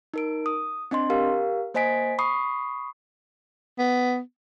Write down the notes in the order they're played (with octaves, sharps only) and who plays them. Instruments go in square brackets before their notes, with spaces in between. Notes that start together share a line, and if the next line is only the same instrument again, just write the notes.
[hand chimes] D#4 A#4 D7
D#6
C4 D4 D#5 C6
G4 A#4 F5
A#3 C5 D#5 G#5 B6 D7
B5 C#6 D#6 C7
[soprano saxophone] B3